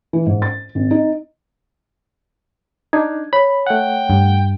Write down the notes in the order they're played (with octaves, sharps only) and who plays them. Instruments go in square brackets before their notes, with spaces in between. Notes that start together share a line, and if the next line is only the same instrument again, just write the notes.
[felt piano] E3
G#2
A6
G#1
D#4
[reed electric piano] D4 D#4 [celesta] G#6
[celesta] C#5 [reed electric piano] B5
[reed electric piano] A3 F#5 [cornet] G5
[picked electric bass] G2